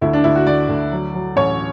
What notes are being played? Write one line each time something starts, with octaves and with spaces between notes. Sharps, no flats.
D2 E4
D4
D2 E4
F#4
D2 D5
D2
F#3
F#3
A1 C#5